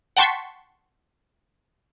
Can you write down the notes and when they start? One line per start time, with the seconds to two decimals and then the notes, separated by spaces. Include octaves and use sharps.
0.17 F#5 G5 A5 C6 C#6 B6